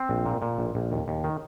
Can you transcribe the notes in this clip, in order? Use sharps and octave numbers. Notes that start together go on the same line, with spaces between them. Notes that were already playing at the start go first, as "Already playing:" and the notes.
Already playing: C4
A#1
A#2
A#2
A#1
A#1
D#2
D#2
D#3